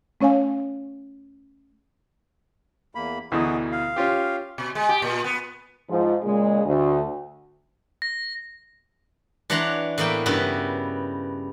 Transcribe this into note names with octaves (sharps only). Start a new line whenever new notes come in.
A3 C#4 C#5 F5 G#5
E2 A#3 B5
D2 B2 E3 D#4 F#4 G#4
F5
C#4 F4 G4
B2
G#3
G4
A#2
B3
G#2 F3
A#2 C#3 G#3
D2
A#6
E3 D4 C#5 F#5 A#5 C6
A2 E3 A#3 B3 G5
G2 C#3 B3 E4 F#4